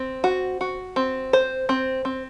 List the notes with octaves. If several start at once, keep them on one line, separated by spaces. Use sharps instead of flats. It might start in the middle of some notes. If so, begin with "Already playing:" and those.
Already playing: C4
F#4
F#4
C4
C5
C4
C4